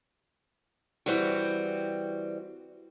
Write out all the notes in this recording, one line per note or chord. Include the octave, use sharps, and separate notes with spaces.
E3 G3 C4 F#4